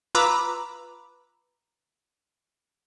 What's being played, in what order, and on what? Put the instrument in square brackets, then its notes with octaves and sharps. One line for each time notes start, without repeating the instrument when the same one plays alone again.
[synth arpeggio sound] F4 B4 A#5 B5 D6 E6